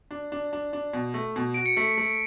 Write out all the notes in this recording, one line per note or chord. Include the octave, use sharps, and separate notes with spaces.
D4
D4
D4
D4
B2
A3
B2
F#4 D7
C#7
A3 B6
A3